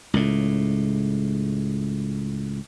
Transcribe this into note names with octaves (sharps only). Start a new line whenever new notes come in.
C#2 A2